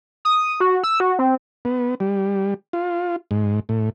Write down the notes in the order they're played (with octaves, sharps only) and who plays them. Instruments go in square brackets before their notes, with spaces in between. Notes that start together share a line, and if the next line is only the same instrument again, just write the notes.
[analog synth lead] D#6
F#4
E6
F#4
C4
[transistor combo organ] B3
G3
F4
G#2
A2